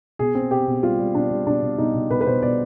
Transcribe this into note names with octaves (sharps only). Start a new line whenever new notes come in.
B2 G#4
C4
B2 G4
B2
G3 F4
G3
B2 D4
G3
B2 D4
B2
B2 D#4
B2
B2 B4
B4
B2 C5
B2 D5